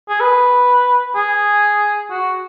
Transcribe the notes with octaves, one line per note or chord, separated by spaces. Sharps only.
G#4
B4
G#4
F#4